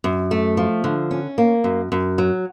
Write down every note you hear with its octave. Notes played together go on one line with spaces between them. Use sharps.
F#2
A3
F3
D3
C#4
A#3
F#2
F#2
F#3